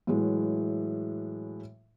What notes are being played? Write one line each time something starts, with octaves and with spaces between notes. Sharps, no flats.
A2 E3 F#3 G#3